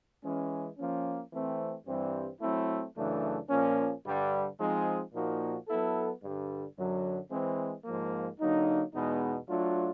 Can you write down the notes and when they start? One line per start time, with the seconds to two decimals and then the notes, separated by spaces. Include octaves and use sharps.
0.23 E3 G#3 C#4
0.78 F3 A#3 C#4
1.32 E3 A3 C4
1.86 G2 E3 G3 C4
2.41 F#3 A3 C4 E4
2.95 F#2 C#3 E3 A3 D4
3.49 A#2 F3 A#3 C#4
4.04 G2 D3 G3
4.59 F3 G#3 C4 D#4 G#4
5.13 A#2 F3 A#3 D#4 F#4
5.67 F#3 B3 E4 A4
6.22 G2 D3 G3
6.76 F#2 D3 F#3
7.31 E3 G#3 C4
7.85 G#2 F3 A#3
8.39 D3 F#3 A#3 D#4
8.94 E2 B2 G#3 B3 D#4
9.48 F#3 A3 D4 F4